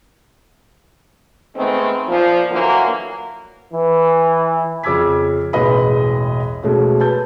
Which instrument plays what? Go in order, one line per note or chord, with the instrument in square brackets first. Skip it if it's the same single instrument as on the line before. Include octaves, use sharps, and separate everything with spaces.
[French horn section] D#3 G#3 A3 B3 C4
A#2 F3
D3 E3 F#3 A#3
[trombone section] E3
[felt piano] F2 C#3 D6 E6 G#6 B6
E1 A1 G#4 B4 D#5 B5
B2 G#3 A3 C#4 F#4
B4 A5 G6